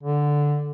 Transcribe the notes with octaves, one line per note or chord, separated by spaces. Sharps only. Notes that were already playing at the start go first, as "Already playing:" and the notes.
D3